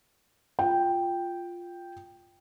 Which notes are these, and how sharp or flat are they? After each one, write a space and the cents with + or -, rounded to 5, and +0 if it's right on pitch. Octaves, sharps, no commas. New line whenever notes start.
F4 +0 G5 +0